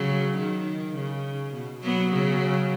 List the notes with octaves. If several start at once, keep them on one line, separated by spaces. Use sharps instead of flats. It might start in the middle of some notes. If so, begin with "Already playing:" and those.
Already playing: C#3 F#3
D#3
C#3
B2
F#3 B3
C#3 F#3